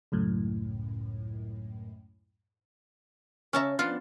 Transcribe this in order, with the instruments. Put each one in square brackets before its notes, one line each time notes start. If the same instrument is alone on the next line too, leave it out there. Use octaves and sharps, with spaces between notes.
[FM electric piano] C#2 F#2 A2
[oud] C#3 C#5 E5 [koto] C#4 A5 A#5
[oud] F3 B3 D4 [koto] F4